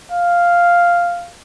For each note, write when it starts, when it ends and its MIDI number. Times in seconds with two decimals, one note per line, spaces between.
0.12 1.32 77